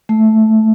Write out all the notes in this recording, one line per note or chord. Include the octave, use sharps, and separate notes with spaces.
A3